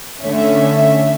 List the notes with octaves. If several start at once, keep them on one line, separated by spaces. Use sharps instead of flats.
D3 A3 C#4 E5